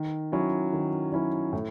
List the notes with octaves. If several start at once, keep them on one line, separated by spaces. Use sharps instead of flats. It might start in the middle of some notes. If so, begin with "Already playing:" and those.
Already playing: D#3
F#3 C#4 E4
D#3
F#3 C#4 E4
A2